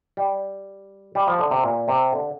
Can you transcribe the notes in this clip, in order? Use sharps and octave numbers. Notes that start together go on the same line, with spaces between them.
G3
G3
F3
D3
C3
A#2
C3
D3